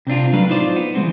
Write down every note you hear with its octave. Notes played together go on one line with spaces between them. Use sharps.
C3 C4 D4 F4
F#3 A3 D4 B4 F5
A2 D#4 F4 C5 D5
B3
E3 F3 G#3 C4